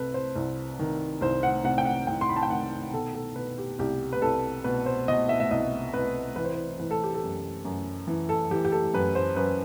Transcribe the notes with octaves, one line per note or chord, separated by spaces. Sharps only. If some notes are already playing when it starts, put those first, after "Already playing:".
Already playing: C2 C3 A4 B4
C5
C2
D#3
C2 C5
F#5
C3 F#5
G5
F#5
C2 G5
C6
B5
A5
G5
D#3 F#5
B2 A4
A4
B2 B4
G4
C2 G4
B4
C2 A4
B2 B4
C5
B2 D#5
E5
E5
C2 D#5
C2 B4
E3 B4
C5
B4
E3 B4
A4
G4
A4
F#2
F#2
E3
A4
E3 G4
G4
A4
F#2 B4
C5
F#2 B4